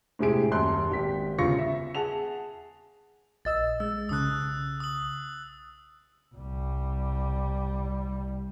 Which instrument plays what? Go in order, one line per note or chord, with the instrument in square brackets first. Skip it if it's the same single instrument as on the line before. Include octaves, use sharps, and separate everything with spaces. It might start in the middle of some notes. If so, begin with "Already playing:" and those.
[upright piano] A2 C3 G#3 G4 G#4 D7
D#1 F#2 A5 C6 F#6
G#1 G4 B6
G1 C#3 F4 C#6 A#6 C#7
E5
G#4 F#5 A5 F7
[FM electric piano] A#1 D#5 E6 [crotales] A6
[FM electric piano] G#3 [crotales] E6
[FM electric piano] B1 C#3 [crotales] D#6 F#6
[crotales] D#6 F#7
[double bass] C2 G3